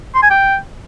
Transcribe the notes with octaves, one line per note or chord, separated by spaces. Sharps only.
C6
G#5
G5